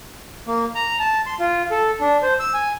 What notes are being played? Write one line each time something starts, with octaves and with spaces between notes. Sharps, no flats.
A#3
A#5
A5
C6
F4
A4
D4
C5
E6
G#5